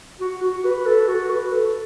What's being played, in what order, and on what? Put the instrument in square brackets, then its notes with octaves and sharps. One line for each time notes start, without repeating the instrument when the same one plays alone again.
[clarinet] F#4
F#4
B4
A4
F#4
B4
A4